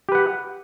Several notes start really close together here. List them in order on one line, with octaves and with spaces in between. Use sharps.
G4 B4 F#5